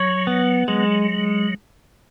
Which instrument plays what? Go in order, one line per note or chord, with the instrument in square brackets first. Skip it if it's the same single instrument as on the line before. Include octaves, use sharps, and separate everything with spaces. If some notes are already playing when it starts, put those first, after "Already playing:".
Already playing: [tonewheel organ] F#3 [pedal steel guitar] C#5
[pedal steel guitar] B3
[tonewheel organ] F#3 [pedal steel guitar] G#3